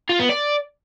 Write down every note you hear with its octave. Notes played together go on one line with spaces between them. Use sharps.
F4
B3
D5